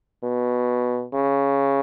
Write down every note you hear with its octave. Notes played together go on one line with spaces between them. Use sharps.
B2
C#3